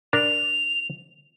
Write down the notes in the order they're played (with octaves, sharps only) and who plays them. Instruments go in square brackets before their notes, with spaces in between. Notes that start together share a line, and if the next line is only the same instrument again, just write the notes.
[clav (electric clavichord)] D4 A#4 D5 [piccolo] F7